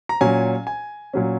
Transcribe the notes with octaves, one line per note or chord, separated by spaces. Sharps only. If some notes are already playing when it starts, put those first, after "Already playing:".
A#5
A#2 F#3 C#4 G#5
G#5
A#2 F#3 C#4